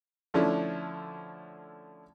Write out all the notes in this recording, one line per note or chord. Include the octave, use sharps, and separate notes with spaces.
D3 F3 A3 C#4 D4 E4